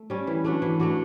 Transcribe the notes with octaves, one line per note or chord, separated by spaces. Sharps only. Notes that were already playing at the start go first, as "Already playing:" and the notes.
Already playing: A3
G3 C#4
E3
A3 D4 F#4
E3
A3 D4 F#4